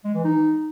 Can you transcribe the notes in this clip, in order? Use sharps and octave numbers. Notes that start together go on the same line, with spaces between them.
G#3
E3
D#4